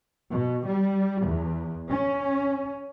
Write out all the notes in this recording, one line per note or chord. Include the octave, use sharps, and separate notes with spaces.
B2
G3
E2
C#4